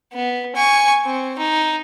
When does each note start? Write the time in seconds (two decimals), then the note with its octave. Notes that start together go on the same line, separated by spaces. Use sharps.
0.13 B3
0.55 G#5 C#6
1.05 C4
1.38 D#4